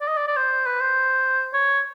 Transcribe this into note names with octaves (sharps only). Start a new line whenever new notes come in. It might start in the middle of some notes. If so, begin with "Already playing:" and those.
D5
D#5
D5
D5
C5
B4
C5
C#5